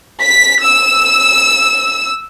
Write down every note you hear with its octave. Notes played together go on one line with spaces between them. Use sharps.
B6
E6